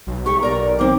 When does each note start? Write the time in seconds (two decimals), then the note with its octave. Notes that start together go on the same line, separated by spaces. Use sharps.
0.07 B1
0.26 G4 C#6
0.43 A#4 D5 A#5
0.79 D#3 C4 D6